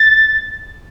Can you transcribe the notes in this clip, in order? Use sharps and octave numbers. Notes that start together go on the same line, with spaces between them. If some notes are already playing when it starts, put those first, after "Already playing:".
Already playing: A6